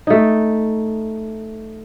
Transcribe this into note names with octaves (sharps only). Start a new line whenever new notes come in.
A3 D#4